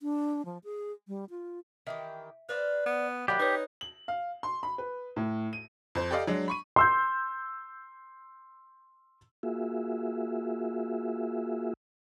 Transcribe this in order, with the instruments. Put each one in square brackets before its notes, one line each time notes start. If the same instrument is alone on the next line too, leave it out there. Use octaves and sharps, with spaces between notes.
[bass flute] D4
F3
G#4
G3
F4
[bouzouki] D#3 E3 G4 [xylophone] E5
[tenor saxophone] B4 [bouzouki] C5 D5 F5
[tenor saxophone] B3
[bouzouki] D#3 A#3 E4 [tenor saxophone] F#3 [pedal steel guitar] G4 [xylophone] D5 B5 F#6
[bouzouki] C4 [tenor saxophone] D#4 [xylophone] B4 C#5
[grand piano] F#7
F5
C6
B5
B4
A2
D#7
[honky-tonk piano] F2 C5
G4 A4 D5 D#5 F5
F#3 G#3 D4
B5 C#6 D#7
[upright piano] C6 E6 G6
[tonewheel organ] A#3 F4 F#4 G#4 E5